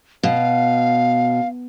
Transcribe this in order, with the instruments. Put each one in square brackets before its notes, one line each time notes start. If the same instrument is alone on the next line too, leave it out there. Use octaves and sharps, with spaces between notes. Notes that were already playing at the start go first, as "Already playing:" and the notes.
[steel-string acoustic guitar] B2 [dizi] F5